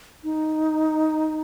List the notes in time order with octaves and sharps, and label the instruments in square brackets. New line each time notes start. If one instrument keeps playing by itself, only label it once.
[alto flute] D#4